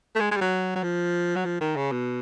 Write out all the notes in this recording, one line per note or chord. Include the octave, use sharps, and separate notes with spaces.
A3
G#3
G#3
G3
F#3
F#3
F3
F#3
F3
D#3
C#3
B2